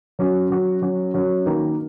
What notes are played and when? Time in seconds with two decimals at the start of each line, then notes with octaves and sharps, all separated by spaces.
0.19 F#3 C#4 F#4
0.50 F#3 C#4 F#4
0.82 F#3 C#4 F#4
1.14 F#3 C#4 F#4
1.45 D#3 A#3 D#4 F#4